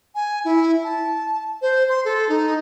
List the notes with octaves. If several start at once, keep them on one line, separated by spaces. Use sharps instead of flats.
G#5
E4
A5
C5
C6
A4
D#4